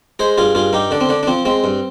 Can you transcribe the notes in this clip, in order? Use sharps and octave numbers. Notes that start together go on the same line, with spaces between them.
G#3 G#4 C5
G2 F4 G#4
G2 F4 G#4
G2 D#4 G4
D3 D4
C4
D3 D4
D4
F3 C4
G#3 C4
G2